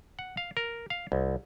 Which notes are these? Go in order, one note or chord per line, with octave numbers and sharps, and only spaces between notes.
F#5
F5
A#4
F5
C2